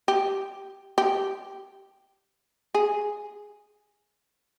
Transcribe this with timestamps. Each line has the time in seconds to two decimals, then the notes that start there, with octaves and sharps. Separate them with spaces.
0.08 G4
0.98 G4
2.74 G#4